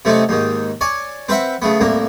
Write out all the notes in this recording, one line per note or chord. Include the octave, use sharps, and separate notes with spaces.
C3 A3 C4 C#4 D#4
D#2 G#2 D#3
C#5 D5 G#5
C4 B4 C5 E5 F#5
C#3 A3 B3
C2 A2 A#3